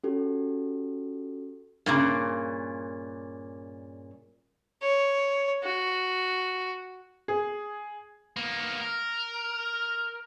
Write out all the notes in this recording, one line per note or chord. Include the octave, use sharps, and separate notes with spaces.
C#4 F#4 G4 A4
G2 A#2 C#3
C#5
F#4
G#4
A#3 B3
A#4